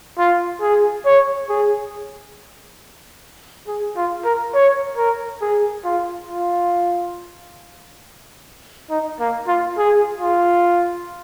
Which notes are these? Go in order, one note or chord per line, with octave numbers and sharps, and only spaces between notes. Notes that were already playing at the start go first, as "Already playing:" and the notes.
F4
G#4
C#5
G#4
G#4
F4
A#4
C#5
A#4
G#4
F4
F4
D#4
A#3
F4
G#4
F4